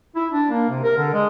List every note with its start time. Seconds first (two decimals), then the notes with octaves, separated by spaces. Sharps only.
0.16 E4
0.31 D4
0.51 A#3
0.69 C3
0.83 A#4
0.98 D3
1.13 G#3